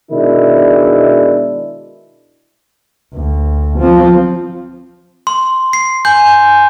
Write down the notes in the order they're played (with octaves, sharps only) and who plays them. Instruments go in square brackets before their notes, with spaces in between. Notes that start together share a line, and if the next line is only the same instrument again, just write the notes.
[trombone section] B2 D#3 G#3 D4 E4
[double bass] D2
F3 C4
[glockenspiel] C6
C7
[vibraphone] G#5 [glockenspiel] C6 G6